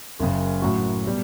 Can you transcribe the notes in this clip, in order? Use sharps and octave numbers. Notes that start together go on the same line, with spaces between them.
F#1 F#2 C#3
A2 F#3 C#4 F#4
B2 G3